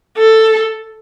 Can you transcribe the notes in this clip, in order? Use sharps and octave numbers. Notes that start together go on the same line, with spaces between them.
A4